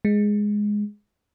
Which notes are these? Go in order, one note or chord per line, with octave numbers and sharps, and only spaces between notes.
G#3